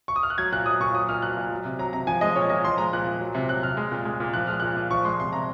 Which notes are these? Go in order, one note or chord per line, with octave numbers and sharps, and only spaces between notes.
C#6
D#6
F6
F#6
F#3 G#6
A#2 F#6
F#3 D#6
A#2 C#6
F#3 D#6
A#2 F6
F#3 F#6
A#2
F#3
C3
F#3 A#5
C3 A#5
F3 G#5
G#3 D#5
A#2 C#5
A#2 D#5
F3 C6
G#3 A#5
A#2 F#6
A#2
F#3
C3
F#3 F#6
C3 F6
G#3
A#2
G#3
A#2
F3 F#6
G#3 F6
A#2 F#6
A#2
F3 C#6
G#3 C6
C3 C6
C3 A#5